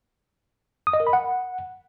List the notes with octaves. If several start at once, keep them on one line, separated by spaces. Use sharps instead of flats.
D#6
D#5
A#4
B5
F#5